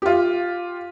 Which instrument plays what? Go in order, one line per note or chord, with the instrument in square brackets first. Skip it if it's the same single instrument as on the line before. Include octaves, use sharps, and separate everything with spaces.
[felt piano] F4 G4